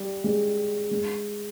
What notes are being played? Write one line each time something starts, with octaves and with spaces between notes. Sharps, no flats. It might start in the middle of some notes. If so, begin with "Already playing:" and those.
Already playing: G3
G#3
G#3